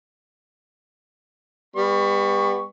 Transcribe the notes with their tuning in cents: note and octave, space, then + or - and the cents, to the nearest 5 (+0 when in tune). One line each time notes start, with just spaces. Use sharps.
G3 +35 B3 +0 C#6 +0